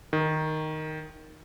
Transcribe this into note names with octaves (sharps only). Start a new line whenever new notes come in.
D#3